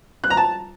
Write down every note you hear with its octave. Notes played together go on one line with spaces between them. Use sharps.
F#6
A#5
A5